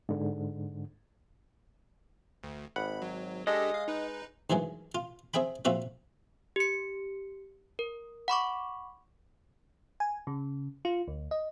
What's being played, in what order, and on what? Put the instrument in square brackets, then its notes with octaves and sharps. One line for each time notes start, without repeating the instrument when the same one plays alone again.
[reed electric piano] G#2 D3
[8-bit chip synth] D2
[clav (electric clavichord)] G#1 F#5 [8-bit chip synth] B5
[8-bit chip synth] F#3
[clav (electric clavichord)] G#3 [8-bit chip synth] D4 G4 A4 [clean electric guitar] D#5
[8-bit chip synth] F5
D#4 B4
[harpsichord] G2 D#3 E3 F#3 G#3
F4
C4 G#4 E5 G5 B5
A#1 C4 F4 F#4 E5
[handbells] G4 C#7
A#4
F#5 B5 C#6 D6
[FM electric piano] G#5
C#3
F4
D2
D#5